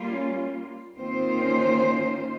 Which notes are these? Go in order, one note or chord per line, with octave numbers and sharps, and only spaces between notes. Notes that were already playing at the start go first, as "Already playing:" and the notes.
Already playing: G3 A#3 F4
C#4
D#3 A#3 C4 F4 C5
C#4
C#4